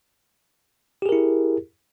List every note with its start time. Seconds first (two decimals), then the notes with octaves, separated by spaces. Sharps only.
1.02 G4
1.06 G#4
1.09 A#4
1.12 E4